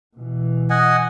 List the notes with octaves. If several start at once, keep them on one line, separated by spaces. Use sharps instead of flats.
B2 E3
D#5 F#5 G#5